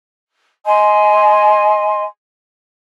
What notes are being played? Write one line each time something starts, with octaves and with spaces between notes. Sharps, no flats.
D#5 G#5 C6